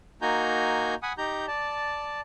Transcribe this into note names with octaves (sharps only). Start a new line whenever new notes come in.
A#3 D#4 F#4 G#5 A#5 G6
F#5 G#5 B5 D#6
D#4 G4 A#5 G6
D5 A5